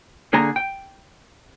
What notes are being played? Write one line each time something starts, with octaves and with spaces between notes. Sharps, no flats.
D3 A#3 G#4 G#5 A#5
G5